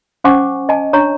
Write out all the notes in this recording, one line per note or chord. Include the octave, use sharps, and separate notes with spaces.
C#4 C5 F#5 G#5 C#6 D6
D#5 G#5 A5
D4 C#5 A#5 C#6